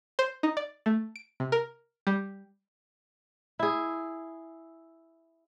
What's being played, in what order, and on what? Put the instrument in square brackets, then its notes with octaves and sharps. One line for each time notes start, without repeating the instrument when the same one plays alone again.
[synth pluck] C5
D#4
D5
A3
D7
C3
A#4
G3
[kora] E4 G#4